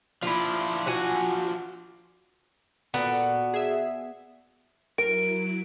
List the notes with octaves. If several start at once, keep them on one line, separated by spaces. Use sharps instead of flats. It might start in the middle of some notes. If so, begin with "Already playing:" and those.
F3 D4 E4 F4
F#4 F#5 G#5
A#2 B3 F#4 A4 D5
G#4 E5
F#3 E4 A#4 D7